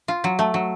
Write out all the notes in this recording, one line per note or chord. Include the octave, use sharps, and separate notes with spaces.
F4
F#3
A3
F#3